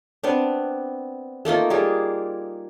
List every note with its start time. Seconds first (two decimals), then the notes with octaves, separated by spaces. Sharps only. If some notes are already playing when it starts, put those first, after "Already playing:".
0.23 B3 C4 D4
1.45 A3 A#3 D#4 F4
1.70 G3 A#3 G#4